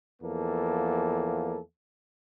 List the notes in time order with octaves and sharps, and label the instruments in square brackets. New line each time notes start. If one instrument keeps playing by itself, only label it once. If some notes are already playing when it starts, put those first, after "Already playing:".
[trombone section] E2 F3 A#3 A4